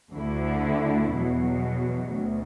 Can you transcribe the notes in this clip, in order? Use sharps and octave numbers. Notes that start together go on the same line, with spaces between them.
D2 D3 A3 E4
E2 B2 F#3
D2